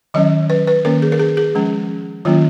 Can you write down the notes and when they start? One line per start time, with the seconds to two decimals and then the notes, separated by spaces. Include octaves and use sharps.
0.14 D#3 F#3 C#4 D#5
0.50 B4
0.67 B4
0.85 D#3 A#3 C#4 A#4
1.02 G#4
1.12 A#4
1.19 G#4
1.37 G#4
1.55 F3 G#3 C#4
2.25 D#3 F#3 A#3 C#4 F4